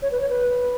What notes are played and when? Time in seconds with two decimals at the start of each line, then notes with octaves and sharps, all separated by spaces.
0.02 C#5
0.12 B4
0.21 C#5
0.29 B4